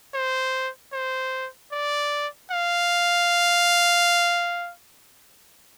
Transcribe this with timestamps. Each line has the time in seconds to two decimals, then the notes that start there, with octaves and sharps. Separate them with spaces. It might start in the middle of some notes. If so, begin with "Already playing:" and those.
0.14 C5
0.93 C5
1.72 D5
2.51 F5